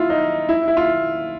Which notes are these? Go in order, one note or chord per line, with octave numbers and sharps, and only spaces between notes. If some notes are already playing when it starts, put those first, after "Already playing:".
Already playing: E4 F4
D#4
E4
E4
F4